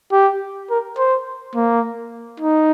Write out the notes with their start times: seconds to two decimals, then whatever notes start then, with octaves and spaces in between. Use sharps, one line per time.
0.12 G4
0.70 A#4
0.98 C5
1.55 A#3
2.40 D#4